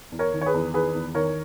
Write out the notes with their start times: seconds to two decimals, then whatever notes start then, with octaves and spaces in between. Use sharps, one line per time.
0.12 E2
0.19 A#4 C#5
0.34 D#3
0.41 C#5
0.46 G#4 B4
0.54 E2
0.74 D#3 G#4 B4
0.95 E2
1.14 D#3 A#4 C#5